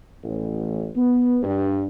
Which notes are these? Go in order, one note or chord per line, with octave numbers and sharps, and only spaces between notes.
A1
B3
G2